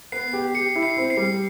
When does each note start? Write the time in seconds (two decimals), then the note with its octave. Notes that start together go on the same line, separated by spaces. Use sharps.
0.12 B3 C7
0.33 G4
0.54 G4 C#7
0.76 E4
0.83 C7
0.97 C4
1.10 C7
1.17 G3